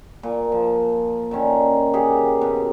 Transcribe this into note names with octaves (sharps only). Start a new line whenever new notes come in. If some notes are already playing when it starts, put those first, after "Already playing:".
A#2
F3
D3 D#3 C#4
G4 G#4 F#5
B2